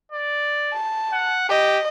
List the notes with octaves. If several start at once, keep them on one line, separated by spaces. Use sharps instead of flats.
D5
A5
F#5
G4 D#5